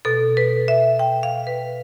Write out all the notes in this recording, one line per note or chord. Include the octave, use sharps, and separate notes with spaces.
B2 A4
B4
E5
G5
F5
B4